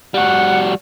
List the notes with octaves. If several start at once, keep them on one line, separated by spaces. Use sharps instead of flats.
G3 F#4 F#5